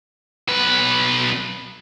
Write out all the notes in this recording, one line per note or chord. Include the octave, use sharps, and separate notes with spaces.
B1 B4